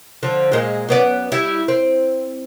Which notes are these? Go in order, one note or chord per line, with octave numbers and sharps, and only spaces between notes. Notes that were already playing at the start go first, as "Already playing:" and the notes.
D3 F3
A#2 G#3
F#2 B3 D5
G3 E4
C4